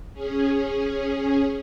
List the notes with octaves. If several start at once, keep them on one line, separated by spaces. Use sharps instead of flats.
C#4 G#4